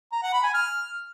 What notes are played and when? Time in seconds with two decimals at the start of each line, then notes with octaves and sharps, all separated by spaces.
0.12 A#5
0.23 F#5
0.33 B5
0.44 G#5
0.54 F6